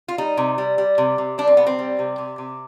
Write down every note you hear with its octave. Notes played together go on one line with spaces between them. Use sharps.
F4
G3 D#4
C3
G3
G3
C3
C3
G3 D4
C4
C3 B3
C4
G3
C3
C3
C3